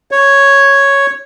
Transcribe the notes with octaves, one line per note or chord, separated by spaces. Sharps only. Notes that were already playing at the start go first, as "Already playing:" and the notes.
C#5